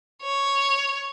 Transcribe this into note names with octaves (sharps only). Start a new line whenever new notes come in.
C#5